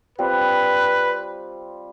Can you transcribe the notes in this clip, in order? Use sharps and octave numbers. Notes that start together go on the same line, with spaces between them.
G3 C4 F4 B4